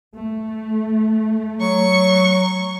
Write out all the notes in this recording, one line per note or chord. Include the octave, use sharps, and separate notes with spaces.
A3
F#3 C#6